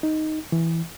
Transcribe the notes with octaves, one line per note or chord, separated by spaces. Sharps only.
D#4
E3